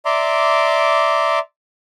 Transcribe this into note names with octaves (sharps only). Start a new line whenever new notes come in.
D5 E5 A#5 C6 D6